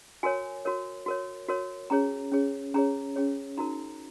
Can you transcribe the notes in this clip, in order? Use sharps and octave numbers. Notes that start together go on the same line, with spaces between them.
F#4 A#4 C#5 G#5
F#4 A#4 C#5
F#4 A#4 C#5
F#4 A#4 C#5
C#4 G#4 C#5 A#5
C#4 G#4 C#5
C#4 G#4 C#5 A#5
C#4 G#4 C#5
D#4 F#4 A#4 A#5